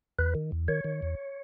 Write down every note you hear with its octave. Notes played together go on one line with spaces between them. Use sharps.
E2 B4
D#3
E2
D#3 C#5
D#3
E2